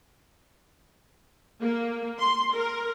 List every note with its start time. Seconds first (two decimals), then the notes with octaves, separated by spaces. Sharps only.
1.61 A#3
2.19 C6
2.54 A#4